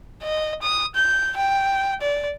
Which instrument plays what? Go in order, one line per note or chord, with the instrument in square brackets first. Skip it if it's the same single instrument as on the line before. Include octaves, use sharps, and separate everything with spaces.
[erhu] D#5
D#6
G6
G5
D5